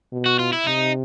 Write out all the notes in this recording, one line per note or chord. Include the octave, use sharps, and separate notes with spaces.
B2
F#4
F4
E4
C3 D#4